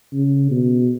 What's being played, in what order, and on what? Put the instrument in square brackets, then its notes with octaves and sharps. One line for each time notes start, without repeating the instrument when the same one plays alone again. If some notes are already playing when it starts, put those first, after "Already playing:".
[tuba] C#3
B2